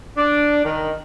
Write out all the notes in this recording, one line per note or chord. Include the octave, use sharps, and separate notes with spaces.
D4
D#3